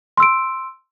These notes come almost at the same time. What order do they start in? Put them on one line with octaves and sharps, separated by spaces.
C6 E6 D7